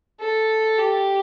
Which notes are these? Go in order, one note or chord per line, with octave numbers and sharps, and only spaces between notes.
A4
G4